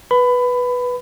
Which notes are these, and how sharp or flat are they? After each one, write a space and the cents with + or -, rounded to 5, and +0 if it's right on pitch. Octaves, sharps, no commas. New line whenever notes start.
B4 -5 B5 +20